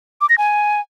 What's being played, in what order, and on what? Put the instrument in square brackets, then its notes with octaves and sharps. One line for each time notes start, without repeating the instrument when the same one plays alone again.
[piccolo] D6
A#6
G#5